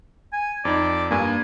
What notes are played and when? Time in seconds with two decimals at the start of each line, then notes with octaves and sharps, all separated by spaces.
0.33 G#5
0.65 F2 D#4 D5
1.11 G2 A#3 G#5